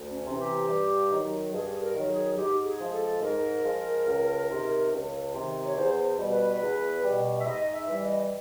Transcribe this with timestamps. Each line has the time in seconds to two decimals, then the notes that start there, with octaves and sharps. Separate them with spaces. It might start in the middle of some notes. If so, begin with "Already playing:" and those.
Already playing: D2
0.11 C#4
0.25 C3
0.30 E3
0.40 G4
0.68 G2
1.11 D#3 F#3
1.53 G2 G#4
1.82 A#4
1.94 D#3 F#3
2.09 G#4
2.37 G#2 G4
2.66 G#4
2.80 F3 G#3
2.93 A4
3.21 G#2 A#4
3.64 F3 G#3
4.07 C#2
4.49 C3 D#3
4.91 C#2
5.34 C3 D#3
5.65 C#5
5.77 E2 C5
6.05 C5
6.18 B2 G3
6.32 B4
6.61 E2
7.02 B2 G3
7.38 E5
7.45 G#2 D#5
7.73 E5
7.87 E3 G3
8.02 D#5